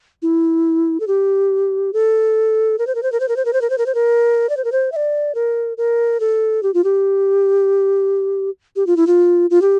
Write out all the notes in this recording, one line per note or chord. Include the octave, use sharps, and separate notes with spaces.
E4
A4
G4
A4
A#4
C5
A#4
C5
A#4
C5
A#4
C5
A#4
C5
A#4
C5
A#4
C5
A#4
D5
C5
A#4
C5
E5
D5
A#4
A#4
A4
G4
F4
G4
G4
F4
E4
F4
F4
G4